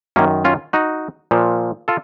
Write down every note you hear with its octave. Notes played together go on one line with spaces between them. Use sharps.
F#2 D#3 A#3 C#4
C#4 F4
D#4 F#4
A#2 F3
F4 A4